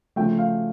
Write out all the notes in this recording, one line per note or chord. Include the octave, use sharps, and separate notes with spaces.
C#3 F3 A3 G5
F5